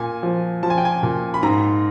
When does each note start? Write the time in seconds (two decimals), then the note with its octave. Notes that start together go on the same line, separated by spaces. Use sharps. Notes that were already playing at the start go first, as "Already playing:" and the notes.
Already playing: A#2 G#5
0.23 F3
0.63 F3 A5
0.70 G#5
0.78 G5
0.85 G#5
1.03 A#2
1.34 B5
1.43 G#2 A#5